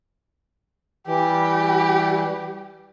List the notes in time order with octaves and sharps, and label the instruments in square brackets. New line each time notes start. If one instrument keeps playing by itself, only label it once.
[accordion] E3 G3 [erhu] G4